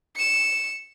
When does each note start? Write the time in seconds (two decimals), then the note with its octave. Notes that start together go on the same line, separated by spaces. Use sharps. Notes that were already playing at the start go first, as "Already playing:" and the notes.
0.16 C#7 E7